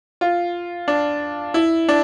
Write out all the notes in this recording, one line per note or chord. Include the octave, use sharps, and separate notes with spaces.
F4
D4
E4
D4